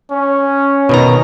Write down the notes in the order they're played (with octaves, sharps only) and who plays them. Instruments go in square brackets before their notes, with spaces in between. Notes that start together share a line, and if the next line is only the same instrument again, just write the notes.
[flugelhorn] C#4
[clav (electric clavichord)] B2 D#3 A#5